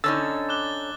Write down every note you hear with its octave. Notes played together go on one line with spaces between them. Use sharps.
D3 C#4 D#4 E6 A6
D6 F#6 G7